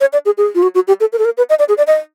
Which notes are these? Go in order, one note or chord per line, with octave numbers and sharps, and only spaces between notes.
C#5
D5
G#4
G#4
F4
F#4
F#4
G4
A4
A#4
A4
A#4
B4
D#5
D5
G#4
D5
D#5